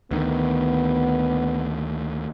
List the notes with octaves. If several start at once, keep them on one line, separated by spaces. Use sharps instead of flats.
D2 D#3 B3